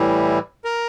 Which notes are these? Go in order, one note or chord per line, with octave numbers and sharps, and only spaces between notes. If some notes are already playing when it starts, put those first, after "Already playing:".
Already playing: A2 E3 G3
A#4